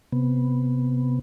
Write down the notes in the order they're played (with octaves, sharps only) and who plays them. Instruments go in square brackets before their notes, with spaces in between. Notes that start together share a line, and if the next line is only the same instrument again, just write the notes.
[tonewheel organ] C3 B3